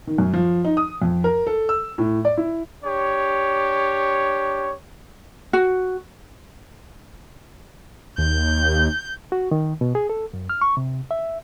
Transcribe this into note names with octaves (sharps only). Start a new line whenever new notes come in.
D#3
F#2
F3
D#4
D#6
F2
A#4
A4
E6
A2
D5
E4
D4 G4 C#5
F#4
D#2 G6
F#4
D#3
B2
G#4
A4
F#2
F6
C#6
C3
E5